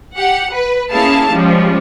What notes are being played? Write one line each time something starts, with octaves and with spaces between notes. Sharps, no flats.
G4 F#5
B4
A#3 C#4 E4 G#4 F5 A5
F3 G3 G#3 C#4